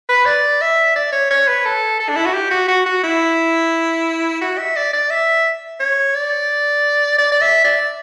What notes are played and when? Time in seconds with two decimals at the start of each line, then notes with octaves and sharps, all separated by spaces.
0.09 B4
0.25 D5
0.61 E5
0.95 D5
1.12 C#5
1.31 C#5
1.47 B4
1.65 A4
2.00 A4
2.09 D4
2.16 E4
2.25 F#4
2.34 G4
2.51 F#4
2.68 F#4
2.86 F#4
3.03 E4
4.41 F#4
4.58 E5
4.76 D5
4.93 D5
5.10 E5
5.80 C#5
6.15 D5
7.18 D5
7.32 D5
7.41 E5
7.64 D5